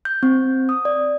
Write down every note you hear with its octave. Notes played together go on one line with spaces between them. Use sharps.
G6
C4
D#6
D5